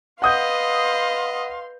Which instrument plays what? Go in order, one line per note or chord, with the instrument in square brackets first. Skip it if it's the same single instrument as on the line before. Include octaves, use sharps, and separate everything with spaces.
[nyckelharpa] B4 D#5 [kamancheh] F5 C6 [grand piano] F#5 D#6 G6